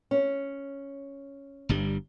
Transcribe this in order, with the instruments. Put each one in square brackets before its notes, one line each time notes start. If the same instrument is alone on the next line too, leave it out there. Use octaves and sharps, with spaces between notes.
[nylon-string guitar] C#4
[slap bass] G1 G2 G3